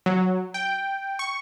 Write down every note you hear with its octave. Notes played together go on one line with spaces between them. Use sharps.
F#3
G5
C#6